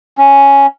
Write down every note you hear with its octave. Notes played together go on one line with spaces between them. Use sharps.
C#4